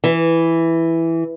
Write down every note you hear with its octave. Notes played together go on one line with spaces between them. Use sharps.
E3